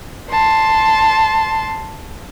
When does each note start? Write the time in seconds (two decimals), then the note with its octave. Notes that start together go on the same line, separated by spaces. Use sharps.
0.31 A5 C6